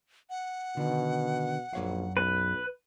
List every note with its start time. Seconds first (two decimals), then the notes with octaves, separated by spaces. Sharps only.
0.30 F#5
0.77 B2 D3 D#3
1.73 A#1 F#2 C#5 F5
2.17 B1 B4